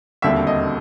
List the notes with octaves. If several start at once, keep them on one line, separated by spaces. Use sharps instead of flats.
E1 D#2 D3 G3 C4 E5
D#5